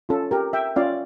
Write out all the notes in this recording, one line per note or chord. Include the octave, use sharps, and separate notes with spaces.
C#4 F4 A4
G4 A#4
E5 G5
C#4 F4 D5 F5